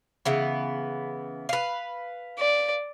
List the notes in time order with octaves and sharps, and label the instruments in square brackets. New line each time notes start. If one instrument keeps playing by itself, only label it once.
[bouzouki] C#3 E3 B3
B4 F5
[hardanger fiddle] D5